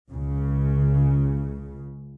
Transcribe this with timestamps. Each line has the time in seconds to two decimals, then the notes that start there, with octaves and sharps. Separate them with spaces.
0.11 C#2 C#3